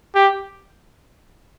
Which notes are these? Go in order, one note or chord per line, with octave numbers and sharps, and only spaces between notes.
G4